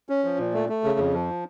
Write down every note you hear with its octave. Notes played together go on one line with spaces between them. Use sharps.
C#4
F3
A#2
A3
A3
C#3
F2
F3